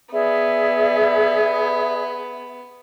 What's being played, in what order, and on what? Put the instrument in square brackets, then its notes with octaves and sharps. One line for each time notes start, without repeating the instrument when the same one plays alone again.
[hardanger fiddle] B3 [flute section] G#4 D5 E5